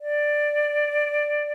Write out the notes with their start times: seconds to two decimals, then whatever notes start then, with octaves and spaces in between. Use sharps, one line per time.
0.01 D5